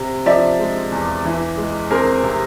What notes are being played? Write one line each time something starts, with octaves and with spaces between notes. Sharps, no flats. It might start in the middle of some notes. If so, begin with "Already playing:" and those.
Already playing: C3
F3 D5 E5
G#3
E2
E3
G#3
C4 G#4 A#4
C3